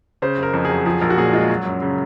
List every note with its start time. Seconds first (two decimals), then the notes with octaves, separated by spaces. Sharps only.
0.22 C#3 C5
0.38 F#1
0.43 A#4
0.54 F2
0.65 F#3 G#4
0.86 F3 G#4
1.01 A#1 A#4
1.10 F#4
1.18 A#2 G#4
1.33 G#3 F4
1.49 F#3
1.65 F#2
1.82 C#3